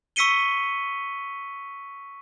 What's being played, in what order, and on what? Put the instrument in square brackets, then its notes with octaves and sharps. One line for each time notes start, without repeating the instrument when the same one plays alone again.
[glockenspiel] C#6 E6 B6 C#7 D#7 G7